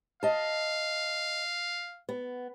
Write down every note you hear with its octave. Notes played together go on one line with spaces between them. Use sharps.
D#5 F5 A5
B3